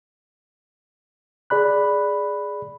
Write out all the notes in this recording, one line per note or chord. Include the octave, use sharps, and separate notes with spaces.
G#4 D5 B5 F#6